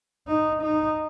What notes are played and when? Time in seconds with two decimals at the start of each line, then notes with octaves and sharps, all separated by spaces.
0.27 D#4
0.63 D#4